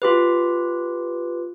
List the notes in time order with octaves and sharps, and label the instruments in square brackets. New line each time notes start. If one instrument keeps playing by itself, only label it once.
[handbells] F4 G4 B4